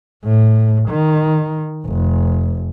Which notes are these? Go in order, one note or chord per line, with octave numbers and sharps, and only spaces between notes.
A2
D#3
F1